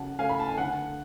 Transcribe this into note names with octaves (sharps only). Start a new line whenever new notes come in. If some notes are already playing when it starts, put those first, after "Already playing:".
Already playing: C#3 F#3 F#5 A5
A3 F5 G#5
B5
A5
G#5
D3 F#5